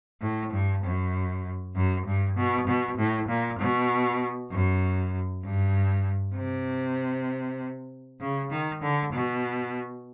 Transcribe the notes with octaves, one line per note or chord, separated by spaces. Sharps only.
A2
G2
F#2
F#2
G2
B2
B2
A2
A#2
B2
F#2
G2
C3
C#3
D#3
D3
B2